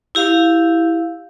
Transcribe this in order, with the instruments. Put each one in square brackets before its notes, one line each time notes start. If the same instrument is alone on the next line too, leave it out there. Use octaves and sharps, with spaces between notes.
[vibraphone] E4 G4 F5